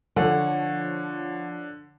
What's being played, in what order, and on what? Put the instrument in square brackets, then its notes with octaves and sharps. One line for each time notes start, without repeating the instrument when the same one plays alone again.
[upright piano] D3 [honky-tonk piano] F3 C#5 [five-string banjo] A4 G#5 A5 [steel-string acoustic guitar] F#5